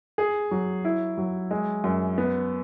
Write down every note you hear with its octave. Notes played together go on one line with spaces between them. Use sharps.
G#4
F#3
E4
F#3
G#3
F#2
B3